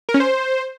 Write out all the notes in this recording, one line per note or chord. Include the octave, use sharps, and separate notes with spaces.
A#4
C#4
C5